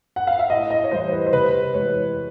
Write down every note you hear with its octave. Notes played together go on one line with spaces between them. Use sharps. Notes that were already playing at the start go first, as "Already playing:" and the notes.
F#5
F5
E5
A2 D#5
D#5
C#5
E3 G3 C5
B4
C5
C3 B4
E3 G#3 C#5